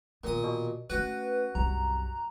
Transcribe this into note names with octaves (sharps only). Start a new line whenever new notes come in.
A#2 D#3 B3 D#6
B2
A3 C#4 F#4 B4
C2 F#2 A#5